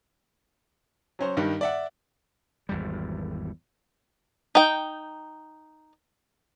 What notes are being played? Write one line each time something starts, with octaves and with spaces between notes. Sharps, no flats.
F#3 C#4 C5
G2 D#3 G3
D5 E5 F#5
G#1 E2 G3
D#4 G5